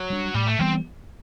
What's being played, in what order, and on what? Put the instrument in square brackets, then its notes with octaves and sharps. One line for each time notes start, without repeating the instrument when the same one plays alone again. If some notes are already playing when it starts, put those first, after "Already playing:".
Already playing: [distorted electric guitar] F#3
[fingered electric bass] G3 D4
[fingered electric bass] A2 [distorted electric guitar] G3
[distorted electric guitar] A3
[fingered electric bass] E3 G3 B3 [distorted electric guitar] C4